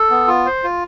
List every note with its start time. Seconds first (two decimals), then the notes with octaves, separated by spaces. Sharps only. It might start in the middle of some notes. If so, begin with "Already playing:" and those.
Already playing: A4
0.10 B3
0.27 F4
0.46 C5
0.64 F4